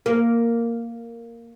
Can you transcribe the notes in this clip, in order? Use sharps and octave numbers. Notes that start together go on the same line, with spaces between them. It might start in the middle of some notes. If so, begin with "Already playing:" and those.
A#3